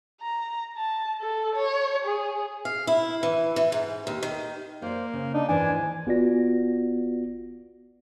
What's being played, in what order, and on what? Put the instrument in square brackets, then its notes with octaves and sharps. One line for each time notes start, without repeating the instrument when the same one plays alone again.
[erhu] A#5
A5
A4
C#5
G#4
[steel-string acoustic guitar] F5
E4
E3
E3
G#2
D#2
D#3
[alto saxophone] A#3 [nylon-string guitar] C5 D5
[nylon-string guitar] C#3
[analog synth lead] D4 [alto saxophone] D#4
[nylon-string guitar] D#2 G#2 E3 [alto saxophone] D4 [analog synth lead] G#5
[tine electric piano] G1 B3 F4 F#4 D5 A#6